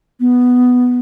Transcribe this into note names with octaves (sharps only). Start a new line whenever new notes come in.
B3